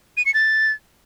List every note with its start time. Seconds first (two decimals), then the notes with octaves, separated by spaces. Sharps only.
0.17 D#7
0.26 C#7
0.34 A6